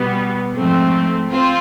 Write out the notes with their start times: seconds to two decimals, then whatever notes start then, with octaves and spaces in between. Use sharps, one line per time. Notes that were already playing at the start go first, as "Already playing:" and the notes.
Already playing: B2 G3 B3
0.54 G#2 F3 A3 C4
1.29 C4 F4